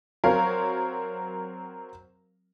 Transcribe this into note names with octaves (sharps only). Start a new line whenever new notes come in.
F#3 C4 A#4 C#5 F5